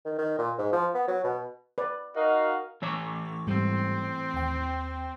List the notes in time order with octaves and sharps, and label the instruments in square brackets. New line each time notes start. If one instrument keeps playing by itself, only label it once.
[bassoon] D#3
D#3
A#2
G#2
F3
B3
F#3
B2
[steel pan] B4 D5
[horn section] D#4 F#4 F5 [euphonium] A#4 [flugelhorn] D#5
[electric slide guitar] A2 E3 C#5 [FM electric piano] C#6 D6 E6
[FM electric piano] G#2 G3 [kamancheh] C4
[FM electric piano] D#2 G5